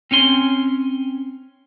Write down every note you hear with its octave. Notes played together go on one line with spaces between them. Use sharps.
C4 C#4 G#5 C6